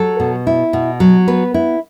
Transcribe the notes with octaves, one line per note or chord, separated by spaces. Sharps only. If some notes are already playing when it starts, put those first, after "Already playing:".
Already playing: F#3 A4
B2
E4
B2
F#3
B3 B4
E4